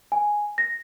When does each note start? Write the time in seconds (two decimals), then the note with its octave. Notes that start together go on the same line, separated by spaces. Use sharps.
0.12 G#5
0.58 A#6